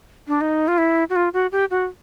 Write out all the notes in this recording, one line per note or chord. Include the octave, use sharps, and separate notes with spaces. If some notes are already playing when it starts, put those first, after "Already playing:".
D4
D#4
F4
E4
F#4
F4
F#4
G4
F#4